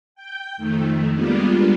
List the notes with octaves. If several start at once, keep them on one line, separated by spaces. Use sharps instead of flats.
G5 G6
F2 D#3 A3
G3 G#3 A#3 B3 D4 F4